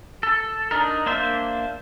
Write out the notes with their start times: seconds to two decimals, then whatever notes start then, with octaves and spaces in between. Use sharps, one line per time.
0.23 A4
0.71 D4 D#4 A#4
1.06 A#3 D4 C5 E5